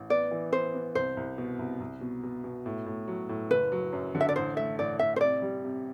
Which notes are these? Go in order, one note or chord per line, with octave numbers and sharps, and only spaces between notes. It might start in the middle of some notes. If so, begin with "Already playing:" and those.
Already playing: A1
B3 D5
E3
B3 C5
B3
C2 C5
C2
B2
C2
C2
B2
B2
B2
A2
A2
F#3
A2
F#1 B4
F#3
F#2
D3
E5
D5
A1 C5
A3 E5
A1 D5
A1 E5
C5
C3 D5
G3
C3